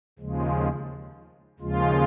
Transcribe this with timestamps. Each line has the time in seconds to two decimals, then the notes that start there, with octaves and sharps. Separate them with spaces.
0.19 D#2 C#3 F3 G#3
1.59 D#2 C#3 F3 G#3 F4